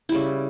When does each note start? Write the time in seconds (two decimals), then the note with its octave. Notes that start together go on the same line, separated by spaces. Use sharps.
0.09 E4
0.12 G3
0.15 C#3